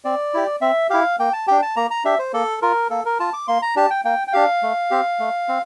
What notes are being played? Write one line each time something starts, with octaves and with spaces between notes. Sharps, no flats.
C4 D5
E4 G4
C4 E5
E4 G4 F5
A#3 G5
A5
D4 G4 G5
A5
A#3 A#5
A#5
D4 G4 E5
C5
A#3 A4
F4 A#4
A#3 A4
A#4
F4 A5
D6
A#3 C6
A#5
D4 G4 A5
G5
A#3 G5
G5
D4 G4 F5
A3
C4 G4
A3
C4